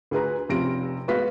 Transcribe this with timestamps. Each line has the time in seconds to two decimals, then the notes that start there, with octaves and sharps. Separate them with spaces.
0.11 D2 G#4 B4 A#5
0.49 F1 C3 C#4 F4 A#6 D7
1.08 G#3 B3 F#4 B4 F5 B6